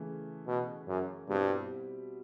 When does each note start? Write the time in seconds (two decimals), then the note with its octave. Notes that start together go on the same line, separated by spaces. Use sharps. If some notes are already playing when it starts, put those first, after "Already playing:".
Already playing: C#3 E3 A3
0.47 B2
0.87 F#2
1.28 G2 B2 G3 C4 E4